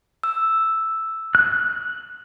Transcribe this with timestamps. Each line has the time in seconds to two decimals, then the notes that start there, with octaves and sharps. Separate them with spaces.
0.23 E6
1.35 F#6